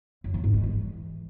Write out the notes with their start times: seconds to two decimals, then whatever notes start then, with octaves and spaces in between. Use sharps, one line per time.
0.24 F#2
0.34 F3
0.44 G#2
0.53 G#3
0.63 E3